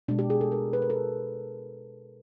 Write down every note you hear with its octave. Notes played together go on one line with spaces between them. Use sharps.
B2 G#3 D4
G4
G#4
A4
A#4
B4
A#4
A4